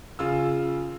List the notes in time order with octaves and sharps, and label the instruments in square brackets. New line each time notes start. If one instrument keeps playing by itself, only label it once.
[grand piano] C#3 F4 E6